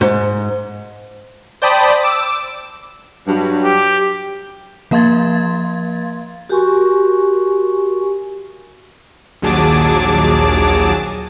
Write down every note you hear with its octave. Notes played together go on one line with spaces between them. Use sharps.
G#2
C5 D5 G5 A5 B5 D#6
D6 E6
G2 F#3
G4
F3 A#3 F5 C6 G#6 A6
F#4 G4 A#4 G#5 C6 C#6
A#1 D#2 F#3 G#4 A5 D6